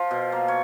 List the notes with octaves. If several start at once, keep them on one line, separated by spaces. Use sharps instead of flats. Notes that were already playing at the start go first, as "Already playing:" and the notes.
Already playing: F3 F4
B2
A#3
C#5